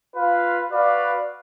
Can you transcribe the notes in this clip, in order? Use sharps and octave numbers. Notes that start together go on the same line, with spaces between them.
F4 B4 F5
F#4 B4 D5 F5